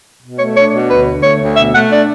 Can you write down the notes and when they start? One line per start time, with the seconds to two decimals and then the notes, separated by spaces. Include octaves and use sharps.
0.22 B2
0.38 A3 C#5
0.55 D4 C#5
0.73 B2
0.89 D2 B4
1.07 D3
1.23 A3 C#5
1.40 D2
1.57 B2 E5
1.73 A3 F#5
1.91 D4 D5